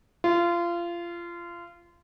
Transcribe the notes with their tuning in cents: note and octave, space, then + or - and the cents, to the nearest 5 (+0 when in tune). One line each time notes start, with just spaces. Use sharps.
F4 -25